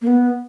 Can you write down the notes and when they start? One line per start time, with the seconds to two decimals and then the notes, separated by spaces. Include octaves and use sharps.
0.01 A#3
0.07 B3